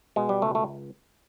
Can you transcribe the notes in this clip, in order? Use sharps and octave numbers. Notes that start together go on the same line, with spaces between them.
B2 G#3
G3
C#2 A3
A3